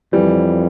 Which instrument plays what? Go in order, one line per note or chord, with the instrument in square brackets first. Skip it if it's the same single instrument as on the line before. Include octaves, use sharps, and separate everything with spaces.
[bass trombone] F2 [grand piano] E3 G3